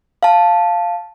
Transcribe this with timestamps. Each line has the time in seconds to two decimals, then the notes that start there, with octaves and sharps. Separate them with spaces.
0.23 F5 A5